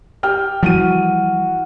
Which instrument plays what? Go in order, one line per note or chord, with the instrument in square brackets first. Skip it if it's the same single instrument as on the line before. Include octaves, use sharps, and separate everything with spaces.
[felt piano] G4 G5 F6
[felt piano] E3 F#4 D#7 [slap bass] F3 G3 [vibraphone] F#5